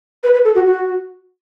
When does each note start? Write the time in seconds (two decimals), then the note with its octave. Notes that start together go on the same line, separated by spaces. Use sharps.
0.23 B4
0.34 B4
0.44 A4
0.55 F#4
0.65 F#4